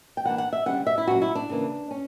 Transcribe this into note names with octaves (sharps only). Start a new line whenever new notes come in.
G5
E3 A#3 D4 F#5
F#5
E5
D3 G3 C#4 F#5
E5
E4
A#2 F#3 C#4 F#4
E4
D4
C#3 E3 A#3
C#4